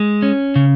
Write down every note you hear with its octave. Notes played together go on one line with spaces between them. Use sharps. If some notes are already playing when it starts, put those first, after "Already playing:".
Already playing: G#3
C#4
C#3